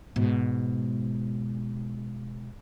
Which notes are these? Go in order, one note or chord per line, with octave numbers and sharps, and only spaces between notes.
G#2 B2